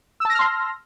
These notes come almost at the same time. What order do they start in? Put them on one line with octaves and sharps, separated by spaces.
E6 A5 A#6 F6 C6